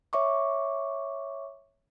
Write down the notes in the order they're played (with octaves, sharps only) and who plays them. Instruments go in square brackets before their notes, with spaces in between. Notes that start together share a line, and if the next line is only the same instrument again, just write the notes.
[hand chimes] C#5 E5 C#6 D6